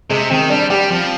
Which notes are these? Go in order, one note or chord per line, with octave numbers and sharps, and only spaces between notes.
C3 G#3
D#3 C4
G3 D4
G3 G4
F3 C4